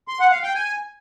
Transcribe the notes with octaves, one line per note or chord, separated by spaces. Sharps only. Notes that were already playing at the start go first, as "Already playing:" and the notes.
C6
F#5
F5
G5
G#5